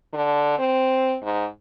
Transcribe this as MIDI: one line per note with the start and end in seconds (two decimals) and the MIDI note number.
0.14 0.57 50
0.59 1.15 60
1.22 1.46 44